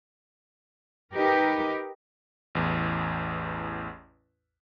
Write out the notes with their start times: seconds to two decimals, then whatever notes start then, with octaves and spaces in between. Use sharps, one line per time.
1.13 D#4 G4 A#4 B4 D#5
2.55 A1 E2